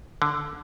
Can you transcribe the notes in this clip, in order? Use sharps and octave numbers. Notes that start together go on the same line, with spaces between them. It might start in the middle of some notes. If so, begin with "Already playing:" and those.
D3